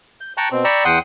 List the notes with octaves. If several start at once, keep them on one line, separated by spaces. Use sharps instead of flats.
G6
G5 A5 A#5 C#6 F#6
B2 C4
D5 G5 A#5 B5 C#6 E6
E2 F#5 G5 C6 D#6